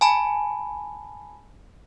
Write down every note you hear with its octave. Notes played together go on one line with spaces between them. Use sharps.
G#5 A5 B5